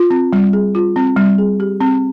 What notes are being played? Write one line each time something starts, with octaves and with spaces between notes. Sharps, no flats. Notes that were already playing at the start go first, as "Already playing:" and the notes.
Already playing: F4
C4
G3
G#4
F4
C4
G3
G#4
G4
C4